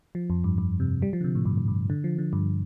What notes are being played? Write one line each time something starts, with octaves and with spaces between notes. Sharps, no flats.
F3
F2
G2
G2
C3
G3
F3
D3
C3
A2
G2
G2
G2
D3
F3
D3
G2